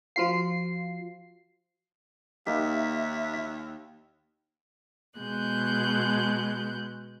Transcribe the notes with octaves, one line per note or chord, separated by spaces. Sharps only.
F3 F4 F#4 F5 C7
D#2 A#3 D#4 G4 E5
B2 G#3 F#6 G6